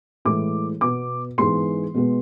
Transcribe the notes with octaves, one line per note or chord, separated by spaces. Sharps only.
A2 E3 G#3 D6
B2 B3 D6
G#2 E3 G#3 B3 C6
B2 G#3 B3